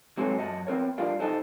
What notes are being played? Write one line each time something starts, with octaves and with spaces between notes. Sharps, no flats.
F#3 G#3 C4 F#4 A4 C#5
F#2 D#5 F#5 A5
B3 C4 A#4 C#5
G3 D4 F4 A#4 F5
D#4 A4 C5 D#5 F#5 A5